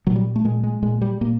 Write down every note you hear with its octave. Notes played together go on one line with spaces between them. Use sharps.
A#2 F#3
G3
A3
A#2 G#3
G#3
A#2 G#3
G3
A#2 A#3